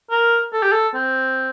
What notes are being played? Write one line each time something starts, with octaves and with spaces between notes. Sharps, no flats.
A#4
A4
G4
A4
C4